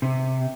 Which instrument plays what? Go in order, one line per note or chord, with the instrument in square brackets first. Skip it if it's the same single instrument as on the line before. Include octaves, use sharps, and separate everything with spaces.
[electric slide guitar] C3